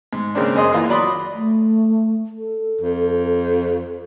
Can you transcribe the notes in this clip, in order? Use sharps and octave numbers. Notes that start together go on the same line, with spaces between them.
G#2
C#3 G#3 A#3 C4 D4
F#2 G#4 D#5 C6 D#6
E3 A#3 F4
F#3 D5 B5 C6 D#6
A3
A4
F2